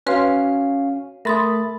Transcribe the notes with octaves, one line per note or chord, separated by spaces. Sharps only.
C#4 F#4 B4 F5 C6
A3 A#4 B5 C6 D#6 A6